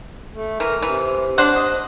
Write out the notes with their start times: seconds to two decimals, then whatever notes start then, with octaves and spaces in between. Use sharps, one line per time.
0.33 A3
0.60 E3 A#4
0.82 C3 E3
1.38 D4 C5 F#5
1.55 D#5